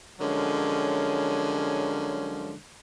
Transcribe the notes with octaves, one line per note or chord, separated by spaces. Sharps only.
D3 F3 F#3 G#3 C#4 A#4